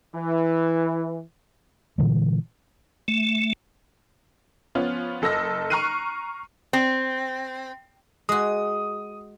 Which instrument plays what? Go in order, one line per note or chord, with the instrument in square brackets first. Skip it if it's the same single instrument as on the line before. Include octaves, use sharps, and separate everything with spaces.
[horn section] E3
[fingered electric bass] A#2 D3 E3 G#3
[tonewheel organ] A3
[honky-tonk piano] F3 B3 C#4 F4
F#1 A4 D#5 E6 A#6
A#5 C#6 F6 F#6 C7 D#7
[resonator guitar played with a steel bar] C4
[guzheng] G#3 F#4 [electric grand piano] D#6